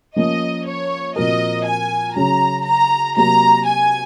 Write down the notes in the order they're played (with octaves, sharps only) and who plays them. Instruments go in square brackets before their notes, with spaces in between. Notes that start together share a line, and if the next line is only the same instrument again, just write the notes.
[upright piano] F3 A#3 C#4 [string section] D#5
[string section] C#5
[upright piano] A#2 F3 C4 F#4 A#4 [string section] D#5
[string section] G#5
[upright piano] C#3 F#3 C#4 [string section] A#5
[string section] A#5
[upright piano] C3 F#3 A#3 [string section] A#5
[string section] G#5